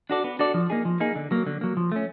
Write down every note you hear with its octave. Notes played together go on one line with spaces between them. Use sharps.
D4 F#4 A4 D5
B3
D4 F#4 A4 D5
F3
A#3 D#4 G#4
F3
A#3 D#4 G#4
D3
F#3 A#3
D3
F#3 A#3
F3
A3 C#4